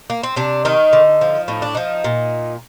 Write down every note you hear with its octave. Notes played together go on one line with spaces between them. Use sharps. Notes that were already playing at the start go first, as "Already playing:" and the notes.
A#3
C4
C3 D4
D#3 D#4
D3
F3
A2 D#4
D4
F3 D#4
A#2